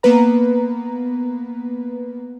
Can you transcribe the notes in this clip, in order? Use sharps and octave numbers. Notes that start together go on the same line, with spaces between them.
A#3 B3 B4 A#5